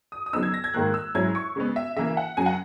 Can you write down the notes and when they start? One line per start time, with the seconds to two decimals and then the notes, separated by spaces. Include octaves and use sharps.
0.12 D#6
0.26 D#6
0.33 C#3 F#3 B3 D#4 E6
0.43 G#6
0.54 A#6
0.64 G#6
0.74 G#2 D#3 A#3 F#6
0.94 E6
1.15 G#2 F#3 C#4 E4 G#6
1.35 C#6
1.56 C#3 G#3 B3
1.76 E5
1.96 C#3 E3 A#3 E5
2.17 F#5
2.37 F#2 C#3 F#3 G#5
2.46 F#5